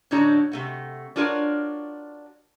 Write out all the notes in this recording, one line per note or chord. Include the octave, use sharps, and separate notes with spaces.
A2 D3 D4 D#4 F#4 C#5
C3 A3 F#4
D4 F4 F#4 A#4 C#5 D5